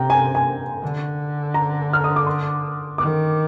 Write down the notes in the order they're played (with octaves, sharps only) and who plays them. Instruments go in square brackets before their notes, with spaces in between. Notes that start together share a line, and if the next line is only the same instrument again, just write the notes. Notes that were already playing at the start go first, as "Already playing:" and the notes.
Already playing: [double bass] C3 [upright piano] G5 A#5
[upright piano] G#5
G#5
[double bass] D3
[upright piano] A#5
F6
D#6
D6
C6
[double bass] D#3 [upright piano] D6